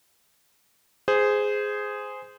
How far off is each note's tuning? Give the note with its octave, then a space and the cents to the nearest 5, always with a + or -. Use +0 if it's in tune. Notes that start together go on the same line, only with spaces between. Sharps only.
G#4 +0 C5 -15